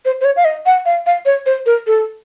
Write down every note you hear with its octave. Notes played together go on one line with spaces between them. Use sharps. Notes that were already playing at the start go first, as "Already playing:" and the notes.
C5
C5
C#5
F5
D#5
F#5
F5
F5
C#5
C5
A#4
A4